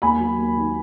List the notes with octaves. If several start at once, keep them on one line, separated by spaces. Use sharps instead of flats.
D#2 G#5 B5
F#3
D#2
D#3